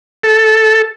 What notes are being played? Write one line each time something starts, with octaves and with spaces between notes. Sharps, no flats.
A4